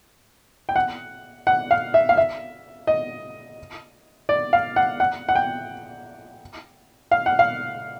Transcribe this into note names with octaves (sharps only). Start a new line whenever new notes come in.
G5
F#5
F#5
F5
E5
F5
E5
D#5
D5
F5
F#5
F#5
F#5
G5
F5
F#5
F5